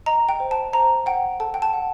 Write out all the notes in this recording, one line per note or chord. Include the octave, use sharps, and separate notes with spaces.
D#5 A#5
G5
C5
A5
C5 A#5
F#5 G5
A4 A5
G5
A5
F#5